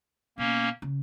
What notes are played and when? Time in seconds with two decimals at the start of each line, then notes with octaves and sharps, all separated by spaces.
0.38 B2 A#3 C#4
0.82 C#3